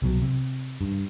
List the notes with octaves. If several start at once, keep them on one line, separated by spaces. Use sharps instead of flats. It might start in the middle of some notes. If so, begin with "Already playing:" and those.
C2 B2 F#3
C3
G2